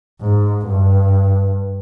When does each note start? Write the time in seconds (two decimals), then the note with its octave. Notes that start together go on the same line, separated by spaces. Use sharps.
0.21 G#2
0.66 G2